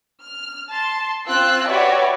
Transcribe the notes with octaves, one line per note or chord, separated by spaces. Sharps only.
F6
A5 C6
C4 F4 E6 F#6
F#4 G4 B4 C#5 D5 E5